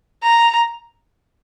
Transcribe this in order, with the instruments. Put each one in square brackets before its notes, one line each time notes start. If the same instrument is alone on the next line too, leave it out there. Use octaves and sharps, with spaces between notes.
[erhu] A#5